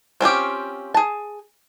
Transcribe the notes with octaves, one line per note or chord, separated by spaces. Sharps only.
C4 C#4 F4 G4
G#4 A5